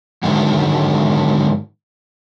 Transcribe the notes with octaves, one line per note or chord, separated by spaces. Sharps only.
G#2 D3 D#3 F#3 G#3